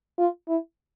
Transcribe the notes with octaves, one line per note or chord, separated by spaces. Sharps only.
F4
E4